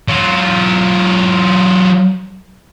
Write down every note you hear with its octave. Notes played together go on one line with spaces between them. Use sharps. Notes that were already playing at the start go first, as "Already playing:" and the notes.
F#3 F4